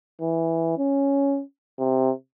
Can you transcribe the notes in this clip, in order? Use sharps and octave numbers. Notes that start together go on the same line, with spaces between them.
E3
C#4
C3